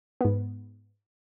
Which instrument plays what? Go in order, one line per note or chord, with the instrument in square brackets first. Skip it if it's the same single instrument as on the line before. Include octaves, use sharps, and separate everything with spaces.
[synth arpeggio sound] G#2 B3